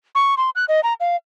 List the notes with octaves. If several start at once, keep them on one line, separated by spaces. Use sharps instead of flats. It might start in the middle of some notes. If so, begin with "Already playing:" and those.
C#6
C6
F#6
D#5
A#5
F5